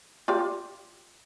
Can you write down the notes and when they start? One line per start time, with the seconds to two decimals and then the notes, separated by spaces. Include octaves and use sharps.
0.28 F4 G4 D5